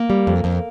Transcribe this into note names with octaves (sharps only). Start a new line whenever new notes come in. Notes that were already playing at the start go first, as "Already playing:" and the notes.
Already playing: A#3
G3
F2
F2